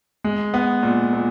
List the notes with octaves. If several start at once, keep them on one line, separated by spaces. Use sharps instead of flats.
G#3
B3
A#2
A#2